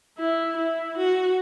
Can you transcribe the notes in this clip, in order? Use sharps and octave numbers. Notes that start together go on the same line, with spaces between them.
E4
E4
F#4